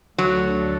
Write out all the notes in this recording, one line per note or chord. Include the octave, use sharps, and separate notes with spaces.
D2 D3 F#3 A3 D4 A4